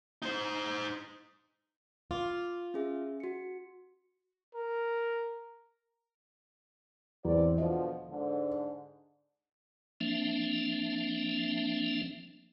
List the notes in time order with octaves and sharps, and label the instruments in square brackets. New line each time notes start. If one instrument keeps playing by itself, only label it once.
[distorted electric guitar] D#4 C5
[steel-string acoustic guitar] F4 [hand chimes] D6
[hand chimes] C#4 G#4 E5
F#4 C#7
[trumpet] A#4
[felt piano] E2 [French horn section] C4 D5
[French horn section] B2 D3 F3 [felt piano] D#5
[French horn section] G#2 D3
[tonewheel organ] F3 A#3 C4 D4 E5